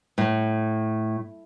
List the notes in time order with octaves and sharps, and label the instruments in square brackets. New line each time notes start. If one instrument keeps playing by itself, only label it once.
[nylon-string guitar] A2